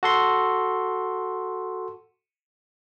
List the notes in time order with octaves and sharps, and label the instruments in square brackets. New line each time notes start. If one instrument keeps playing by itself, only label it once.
[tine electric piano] F#4 A4 C6